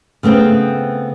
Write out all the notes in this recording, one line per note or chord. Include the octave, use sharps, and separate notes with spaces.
C#3 A3 B3 C4 G5